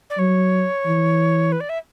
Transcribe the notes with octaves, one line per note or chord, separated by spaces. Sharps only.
D5
F#3 C#5
E3
B4
D5
E5